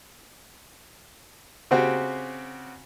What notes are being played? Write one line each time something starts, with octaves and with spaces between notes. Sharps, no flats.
C#3 C4 F#4 G4